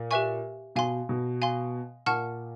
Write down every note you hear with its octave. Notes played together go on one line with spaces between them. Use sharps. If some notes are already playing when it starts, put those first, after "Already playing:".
Already playing: A#2
G4 B4 E5 G#5 C#6
B2 F5 G#5 C6
B2
F5 G#5 C6
A#2 F#5 A5 C#6 F6